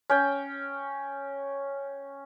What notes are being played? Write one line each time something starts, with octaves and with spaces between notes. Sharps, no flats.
C#4 G5